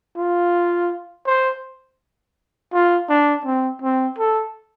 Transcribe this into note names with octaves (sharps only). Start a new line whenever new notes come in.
F4
C5
F4
D4
C4
C4
A4